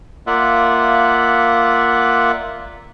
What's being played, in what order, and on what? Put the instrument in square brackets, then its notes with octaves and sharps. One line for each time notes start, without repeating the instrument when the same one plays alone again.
[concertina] A#3 F4 D5 E5 F#5